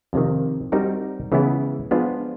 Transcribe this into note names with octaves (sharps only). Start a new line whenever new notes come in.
F2 C3 D#3
G3 C4 D#4 F#4 A#4
C#3 E3 G#3 B3 E4
F3 G#3 B3 D4 F4